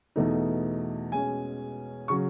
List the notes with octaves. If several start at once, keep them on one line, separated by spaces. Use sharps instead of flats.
E2 B2 A3 D#4
B2 G#3 C#4 G#5
C#3 F#3 C#6